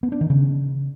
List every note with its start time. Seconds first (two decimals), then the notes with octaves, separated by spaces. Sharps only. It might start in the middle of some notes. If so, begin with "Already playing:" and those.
0.03 B3
0.12 D4
0.21 D#3
0.30 C#3